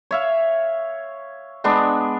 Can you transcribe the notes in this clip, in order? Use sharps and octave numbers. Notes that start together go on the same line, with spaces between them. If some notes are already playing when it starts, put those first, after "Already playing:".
C#5 E5 F5
G#3 B3 D4